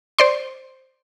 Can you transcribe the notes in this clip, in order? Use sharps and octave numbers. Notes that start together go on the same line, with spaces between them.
C5 D5 C6